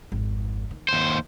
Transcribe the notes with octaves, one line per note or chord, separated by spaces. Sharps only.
G#1 F2
D#3
D#2 C5